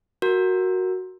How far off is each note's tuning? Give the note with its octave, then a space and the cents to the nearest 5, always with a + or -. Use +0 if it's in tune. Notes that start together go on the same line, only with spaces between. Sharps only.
F#4 +0 A#4 +0